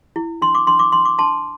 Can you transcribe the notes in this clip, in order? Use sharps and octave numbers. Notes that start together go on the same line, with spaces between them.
E4
D4 C6
D6
D4 C6
D6
D4 C6
D6
D4 A5 C6